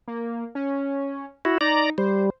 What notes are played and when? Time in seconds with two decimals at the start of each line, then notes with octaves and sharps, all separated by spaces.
0.08 A#3
0.55 C#4
1.45 E4 F#4
1.61 D#4 D5 A#5
1.98 G3 C5